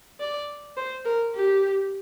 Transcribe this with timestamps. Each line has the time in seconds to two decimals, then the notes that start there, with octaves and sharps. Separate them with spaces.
0.20 D5
0.77 C5
1.05 A#4
1.35 G4